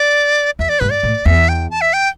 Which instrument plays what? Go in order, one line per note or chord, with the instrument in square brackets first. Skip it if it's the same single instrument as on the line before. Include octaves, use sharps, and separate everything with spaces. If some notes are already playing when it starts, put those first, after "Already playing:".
Already playing: [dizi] D5
[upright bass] E2 [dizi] E5
[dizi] D5
[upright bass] G2 [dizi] B4
[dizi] D5
[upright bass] A2
[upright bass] E2 [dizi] E5
[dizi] G5
A5
E5
G5